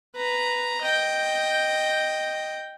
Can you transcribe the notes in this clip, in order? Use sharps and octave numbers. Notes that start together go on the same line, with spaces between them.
B4 A#5
D#5 G5